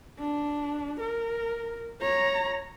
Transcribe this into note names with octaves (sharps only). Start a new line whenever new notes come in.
D4
A#4
C#5 A#5